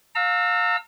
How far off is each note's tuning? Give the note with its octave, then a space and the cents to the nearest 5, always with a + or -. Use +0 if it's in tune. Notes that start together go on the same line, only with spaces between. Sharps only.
F5 +30 A#5 -40 E6 +0